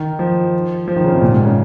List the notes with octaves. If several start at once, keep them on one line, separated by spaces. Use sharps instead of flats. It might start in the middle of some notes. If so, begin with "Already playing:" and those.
Already playing: D#3
F3
F3
D#3
C#3
C3
A#2
G#2
C#3